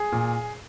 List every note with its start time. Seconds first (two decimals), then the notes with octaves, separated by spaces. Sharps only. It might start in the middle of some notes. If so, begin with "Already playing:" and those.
Already playing: G#4
0.12 A#2